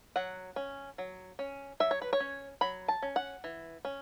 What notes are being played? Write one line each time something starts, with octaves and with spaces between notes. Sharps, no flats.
F#3 F#5
C#4
F#3
C#4
F#3 E5
C#5
B4
C#5
C#4
F#3 B5
A5
C#4
F#5
E3
C#4